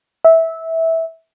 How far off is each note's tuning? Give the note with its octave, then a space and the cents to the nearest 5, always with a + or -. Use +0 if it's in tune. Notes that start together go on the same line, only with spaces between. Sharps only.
E5 -15